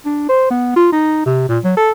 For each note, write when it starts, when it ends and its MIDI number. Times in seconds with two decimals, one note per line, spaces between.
0.06 0.28 62
0.29 0.48 72
0.50 0.76 59
0.76 0.90 65
0.92 1.25 63
1.26 1.48 48
1.49 1.59 46
1.64 1.76 54
1.77 1.92 69